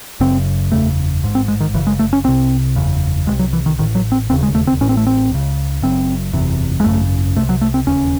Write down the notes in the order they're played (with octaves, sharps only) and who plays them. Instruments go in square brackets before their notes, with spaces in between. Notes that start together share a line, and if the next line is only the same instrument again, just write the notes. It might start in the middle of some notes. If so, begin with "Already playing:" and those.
[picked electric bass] F#1 F#2 C#3 C4
F#1 E2 C#3 A3
A1 G#2
C4
G#3
D#3
F#1 F#2 C#3 E3
G#3
A3
C#4
C2 C3 C4
F#1 E2 C#3
C2 G#3
C3
F#3
E3
D#3
A1 A2 D#3
F#3
C4
E1 D#2 C#3 C4
G#3
A3
C4
A1 A2 C#4
C4
A3
C4
C#2 C#3
F#1 F#2 C#3 C4
F#1 E2 C3
G#3
G#1 F#2 C#3 A3
C2 C3 A3
F#3
A3
C4
E1 D#2 C#3 C#4